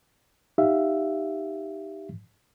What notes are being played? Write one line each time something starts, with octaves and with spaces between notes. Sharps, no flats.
D#4 G4 E5 F5